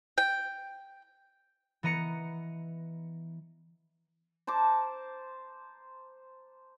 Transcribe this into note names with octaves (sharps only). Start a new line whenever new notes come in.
G5
E3 B3 D#5 A#5 C#7
C5 A5 A#5 D6